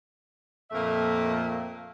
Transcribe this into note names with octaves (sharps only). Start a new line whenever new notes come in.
F2 A#2 A3 A#3 A#4 E5